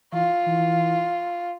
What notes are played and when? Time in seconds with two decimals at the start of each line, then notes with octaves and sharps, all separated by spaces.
0.13 E3 F4
0.47 E3